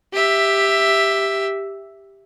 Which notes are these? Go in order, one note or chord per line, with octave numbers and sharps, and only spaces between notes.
G4 E5